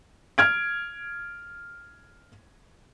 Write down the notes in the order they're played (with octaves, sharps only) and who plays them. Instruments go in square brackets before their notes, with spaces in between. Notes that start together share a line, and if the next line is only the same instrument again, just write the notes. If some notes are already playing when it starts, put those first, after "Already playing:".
[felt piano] F6 G#6 D7